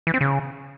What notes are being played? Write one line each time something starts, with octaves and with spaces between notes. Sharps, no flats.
E3
C4
C#3